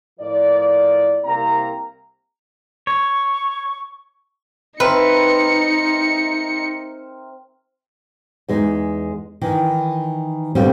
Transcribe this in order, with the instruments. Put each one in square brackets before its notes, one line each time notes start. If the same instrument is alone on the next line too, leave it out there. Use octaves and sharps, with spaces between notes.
[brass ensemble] A2 F3 A#4 D5
C2 A#3 C4 A#5
[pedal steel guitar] C#5 [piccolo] C#6
[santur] C4 A#4 E5 [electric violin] D#4 C#7 [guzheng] B4
[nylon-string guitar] E2 G#3 D#4
D#3 E3
A#2 D3 G3 A3 B3 C4